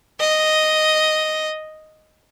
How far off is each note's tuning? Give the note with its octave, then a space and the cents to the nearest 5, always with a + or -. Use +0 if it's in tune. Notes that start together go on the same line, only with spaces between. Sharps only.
D#5 +0